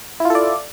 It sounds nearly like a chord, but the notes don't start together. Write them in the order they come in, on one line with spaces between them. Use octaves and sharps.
E4 F4 A4 D5